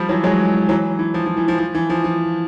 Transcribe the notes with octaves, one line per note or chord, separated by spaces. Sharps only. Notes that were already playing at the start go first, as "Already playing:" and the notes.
Already playing: F3 G3
E3 F#3
F#3 G#3
E3 F#3
E3
F3
F3
E3
F3
F3
E3
F3
F3